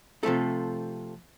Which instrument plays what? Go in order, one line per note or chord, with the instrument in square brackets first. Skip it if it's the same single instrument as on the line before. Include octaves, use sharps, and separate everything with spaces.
[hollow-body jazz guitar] C3 F3 A3 A4